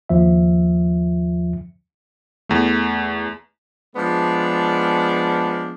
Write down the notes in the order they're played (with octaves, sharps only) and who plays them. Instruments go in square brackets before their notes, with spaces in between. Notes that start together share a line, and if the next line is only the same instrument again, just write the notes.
[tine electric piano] D#2 F3 E5
[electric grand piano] E2 A3
[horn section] F3 G#3 B3 D4 D5